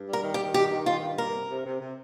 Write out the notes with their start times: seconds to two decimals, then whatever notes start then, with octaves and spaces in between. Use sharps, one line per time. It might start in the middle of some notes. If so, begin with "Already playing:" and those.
Already playing: G2
0.08 G3
0.13 A#4
0.24 D#3
0.34 G4
0.40 D#3
0.54 G2 G4
0.71 D#3
0.86 G2 F4
1.02 G2
1.18 A#3 A#4
1.34 C3
1.49 C3
1.66 C3
1.81 C3